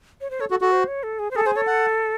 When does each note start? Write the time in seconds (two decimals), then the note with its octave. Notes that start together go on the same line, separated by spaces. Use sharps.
0.21 C#5
0.30 C5
0.40 A4 C#5
0.50 F#4 A4
0.61 F#4 A4
0.72 C5
0.88 C#5
1.03 A4
1.19 G#4
1.31 C5
1.36 G#4 A4
1.46 G#4 C5
1.56 A4 C#5
1.67 F#5